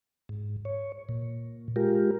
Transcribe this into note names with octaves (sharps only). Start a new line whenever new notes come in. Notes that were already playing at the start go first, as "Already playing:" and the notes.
G#2
C#5
A#2
G#3 F4 G4 A#4